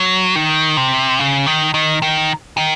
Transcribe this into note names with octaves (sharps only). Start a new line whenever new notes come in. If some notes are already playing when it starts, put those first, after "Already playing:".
Already playing: F#3
D#3
C3
C#3
D#3
D#3
D#3
D#3